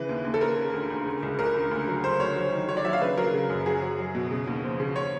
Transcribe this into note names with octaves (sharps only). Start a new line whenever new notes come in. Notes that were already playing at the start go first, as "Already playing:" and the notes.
Already playing: C#3 E3 B4
D#2
D#2
A4
C#3 A#4
C#3
D2
D2
C#3
C#2
C#2 A#4
C#3
D2
F#3
D2 C5
D2 C#5
F#3
D#3
F#3 C#5
D5
F#3 E5
F5
C#3 B4
F#3 A#4
C#3
F#2
F#3 G#4
F#3
F#3
B2
C#3
D#2
F3
C#3
C#5